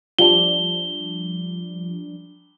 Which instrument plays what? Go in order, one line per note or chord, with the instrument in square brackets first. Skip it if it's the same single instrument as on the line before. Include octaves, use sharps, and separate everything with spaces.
[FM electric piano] F3 G3 D4 [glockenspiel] G7